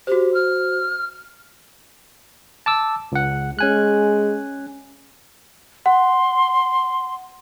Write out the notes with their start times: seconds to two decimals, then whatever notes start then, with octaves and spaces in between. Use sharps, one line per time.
0.07 F#4 G4 C5
0.34 F6
2.66 A5 D6 E6
3.12 C#2 F#5
3.59 G#3 C#4 G#5 F#6
5.86 F#5 C6